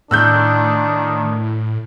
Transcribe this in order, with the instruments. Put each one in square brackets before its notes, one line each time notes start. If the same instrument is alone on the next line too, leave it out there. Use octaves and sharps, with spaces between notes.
[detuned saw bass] A2 [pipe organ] D#3 [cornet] D4 [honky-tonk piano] E6 F#6 G6